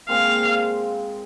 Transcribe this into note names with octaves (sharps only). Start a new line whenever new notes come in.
A#2 G#3 C4 F5